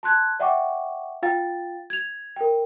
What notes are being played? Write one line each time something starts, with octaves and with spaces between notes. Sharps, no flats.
A5 C6 F#6 G#6
D5 E5 F#5 G5 C#6 D6
F4 F5 G5 A6
G#6 F7
A#4 G5